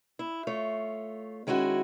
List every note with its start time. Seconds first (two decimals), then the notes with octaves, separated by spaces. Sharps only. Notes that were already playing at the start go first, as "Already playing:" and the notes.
0.19 E4
0.47 A3 F4 C#5
1.47 D#3 G#3 C#4 E4 F#4